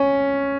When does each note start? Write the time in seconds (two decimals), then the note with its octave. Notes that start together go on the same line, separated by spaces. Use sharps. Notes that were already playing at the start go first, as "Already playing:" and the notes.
Already playing: C#4